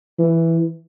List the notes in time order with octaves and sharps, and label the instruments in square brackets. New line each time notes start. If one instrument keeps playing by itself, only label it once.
[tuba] E3